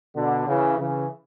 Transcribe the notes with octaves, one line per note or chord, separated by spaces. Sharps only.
B2 D3
C#3 E3
C#3 E3